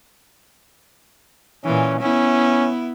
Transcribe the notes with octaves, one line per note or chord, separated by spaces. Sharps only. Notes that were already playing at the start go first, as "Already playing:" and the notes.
A#2 E3 C#4
B3 C#4 E4